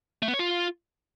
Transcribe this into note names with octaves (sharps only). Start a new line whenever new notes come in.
A3
B3
C#5
F4